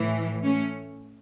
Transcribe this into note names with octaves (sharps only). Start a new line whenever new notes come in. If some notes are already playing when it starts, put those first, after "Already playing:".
Already playing: A2 E3
A3 C#4